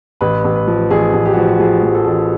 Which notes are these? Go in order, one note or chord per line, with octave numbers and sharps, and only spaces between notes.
A1 B4
A1
B4
F3
A1 G#4
A1
G4
F#4
F3
F#4
F3 G#4
F3
A4
A1